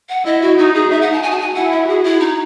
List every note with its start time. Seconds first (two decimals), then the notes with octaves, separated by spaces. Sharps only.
0.09 F#5
0.25 E4 D#5
0.42 F#4
0.58 D#4 F#4
0.75 G#4
0.90 D#4 E5
1.02 F#5
1.12 A5
1.23 F#4 G#5
1.31 A5
1.39 G#5
1.55 E4 F#5
1.72 E5
1.88 F#4 G#4
2.04 E4
2.20 D#4